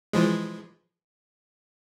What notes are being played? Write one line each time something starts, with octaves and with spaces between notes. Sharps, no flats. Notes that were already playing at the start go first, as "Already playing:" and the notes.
E3 F3 G#3